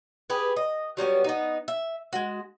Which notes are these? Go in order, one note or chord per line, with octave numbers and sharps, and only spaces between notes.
G4 G#4 B4
D#5
F#3 G3 B3 C#4
B3 D#4
E5
G#3 F#4